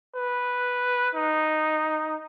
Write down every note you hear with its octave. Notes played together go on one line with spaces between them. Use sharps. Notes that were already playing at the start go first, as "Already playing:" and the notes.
B4
D#4